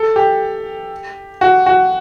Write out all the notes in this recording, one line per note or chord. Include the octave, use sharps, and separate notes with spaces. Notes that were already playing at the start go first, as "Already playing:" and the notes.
Already playing: A4
G4
F#4
F#4